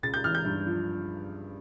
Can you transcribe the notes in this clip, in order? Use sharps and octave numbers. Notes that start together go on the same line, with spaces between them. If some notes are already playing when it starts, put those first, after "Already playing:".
C#2 A6
G6
E3 F6
G6
G2
F3